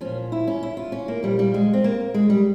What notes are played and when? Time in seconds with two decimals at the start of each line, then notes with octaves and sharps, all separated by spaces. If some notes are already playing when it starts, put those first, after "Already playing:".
0.01 A#2 F3 C#4
0.32 E4
0.47 C#4
0.63 E4
0.77 F4
0.92 C#4
1.08 A#3
1.23 A#2 F3 G3
1.39 G3
1.54 G#3
1.73 C4
1.84 A#3
2.14 G#3
2.30 G3